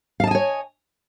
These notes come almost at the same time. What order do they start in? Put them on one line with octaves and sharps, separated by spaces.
F5 A5 D#5 G#5 C#5